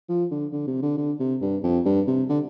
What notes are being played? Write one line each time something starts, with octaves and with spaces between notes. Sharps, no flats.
F3
D3
D3
C3
D3
D3
C3
G2
F2
G2
C3
D3